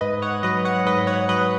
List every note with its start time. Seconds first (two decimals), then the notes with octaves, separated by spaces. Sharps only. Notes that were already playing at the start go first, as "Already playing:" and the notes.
0.01 G#2 B4 D#5
0.22 C#5 F#5
0.43 F#3 B4 D#5
0.64 C#5 F#5
0.85 G#2 B4 D#5
1.07 C#5 F#5
1.29 F#3 B4 D#5